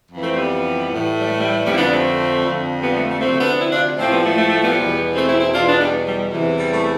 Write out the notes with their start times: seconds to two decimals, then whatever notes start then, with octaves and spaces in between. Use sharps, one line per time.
0.09 F2 E3
0.23 A3 C4
0.35 G3 B3
0.87 A2 E3
1.18 G3
1.26 A3
1.39 G3
1.52 A3
1.65 F2 D3 F3 G3 B3
1.72 E4
1.78 B3 D4
1.92 A3 C4
2.42 F2 D3 F3
2.81 G3 B3
2.95 A3
3.08 A3
3.20 D2 C3 F3 A3 C4
3.40 B3 D4
3.59 C4 E4
3.72 D4 F4
3.98 A2 F3 A3 C4
4.11 G3 B3
4.24 A3
4.37 A3
4.50 A3
4.63 G3 B3
4.76 E2 B2
5.15 A3 C4
5.27 C4 E4
5.40 C4 E4
5.53 E2 B2 D4 F4
5.67 B3 D4
5.79 G3 B3
6.06 G3
6.31 E2 C3 E3
6.59 G3
6.71 A3